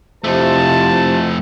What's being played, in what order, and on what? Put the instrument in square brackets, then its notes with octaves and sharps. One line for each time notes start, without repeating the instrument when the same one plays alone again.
[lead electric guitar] F2 A3 [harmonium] C3 [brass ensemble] E4 F4 C5 [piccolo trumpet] A5